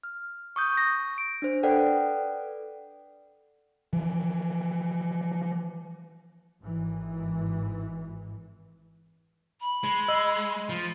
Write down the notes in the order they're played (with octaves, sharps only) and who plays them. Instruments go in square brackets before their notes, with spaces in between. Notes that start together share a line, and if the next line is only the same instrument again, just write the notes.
[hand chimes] F6
C#6 D#6 G6
A#6
D7
D4 C5
A4 B4 D5 F#5 G5
[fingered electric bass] E3 F3
[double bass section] G#1 G#2 E3
[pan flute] B5
[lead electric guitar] G#3
[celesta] D#5 E6 F#7
[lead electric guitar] F3